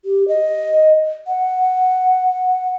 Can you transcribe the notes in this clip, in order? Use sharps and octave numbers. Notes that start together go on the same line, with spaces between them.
G4
D#5
F#5